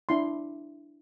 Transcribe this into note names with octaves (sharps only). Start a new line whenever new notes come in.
D4 E4 C6